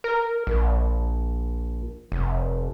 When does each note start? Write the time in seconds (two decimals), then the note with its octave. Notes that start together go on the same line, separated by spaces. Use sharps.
0.04 A#4
0.47 A#1
2.12 F1